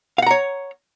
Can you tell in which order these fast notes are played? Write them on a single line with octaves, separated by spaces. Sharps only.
F5 F#5 A#5 C#5